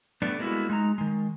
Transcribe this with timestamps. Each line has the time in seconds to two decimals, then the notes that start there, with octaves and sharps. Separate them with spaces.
0.22 G3 A3 B3 D4 D5
0.39 G3 G#3 A#3 B3 E4 F#4
0.70 G#3 D#4 A#5
0.98 D#3 G#3